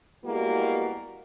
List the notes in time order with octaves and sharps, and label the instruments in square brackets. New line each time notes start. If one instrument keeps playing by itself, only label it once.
[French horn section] G3 G#3 A#3 B3 E4 F#4